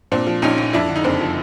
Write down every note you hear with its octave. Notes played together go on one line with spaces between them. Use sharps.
A#2 C4 D4
F3
A#1 C#4 D#4
A#1
F2 D4 E4
D3
D#4
F#1 C4 D4
F3